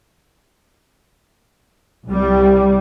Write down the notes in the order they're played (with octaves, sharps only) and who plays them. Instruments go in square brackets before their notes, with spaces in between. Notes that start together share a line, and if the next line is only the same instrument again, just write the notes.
[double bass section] C2 G3